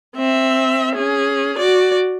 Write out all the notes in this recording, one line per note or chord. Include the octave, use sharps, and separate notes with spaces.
C4 E5
C#4 G#4
F#4 D5